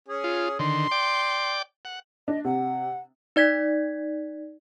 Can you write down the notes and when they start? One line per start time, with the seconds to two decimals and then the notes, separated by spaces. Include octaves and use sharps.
0.08 C#4 G#4
0.24 F4
0.59 D3 D#3 C6
0.91 D5 G5 D6
1.85 F#5
2.28 D4 D#5
2.45 C3 F#5
3.36 D#4 D5 G#6 B6